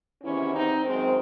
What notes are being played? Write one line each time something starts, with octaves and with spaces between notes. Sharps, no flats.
E2 C3 D#3 C#4 E4
C4 D#4
F#2 D#3 G#3 C4